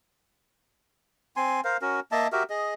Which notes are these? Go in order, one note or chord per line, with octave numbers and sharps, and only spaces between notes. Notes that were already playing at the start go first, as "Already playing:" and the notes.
C4 G#5 C6
A#4 C5 F5
C#4 F#4 A#4
A#3 D#5 E5 A5
F#4 G4 A#4 E5
G#4 D#5